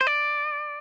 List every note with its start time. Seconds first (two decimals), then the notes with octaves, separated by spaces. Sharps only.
0.01 C5
0.07 D5